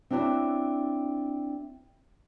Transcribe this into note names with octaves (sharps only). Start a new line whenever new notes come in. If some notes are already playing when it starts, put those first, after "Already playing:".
C4 D4 E4 F#4 C#5